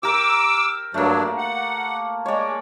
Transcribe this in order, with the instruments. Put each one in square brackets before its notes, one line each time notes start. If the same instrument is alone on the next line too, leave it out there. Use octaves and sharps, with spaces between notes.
[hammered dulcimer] G4 A#4 [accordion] D6 E6
[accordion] G2 F#3 D4 [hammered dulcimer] A3 A#3
[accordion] F#5
[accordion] G#3 [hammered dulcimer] C#5 D5